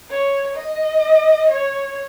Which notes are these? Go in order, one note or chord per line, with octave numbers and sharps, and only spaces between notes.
C#5
D#5
C#5